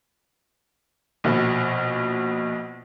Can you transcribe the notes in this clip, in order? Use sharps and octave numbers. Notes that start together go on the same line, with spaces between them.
A#1 B2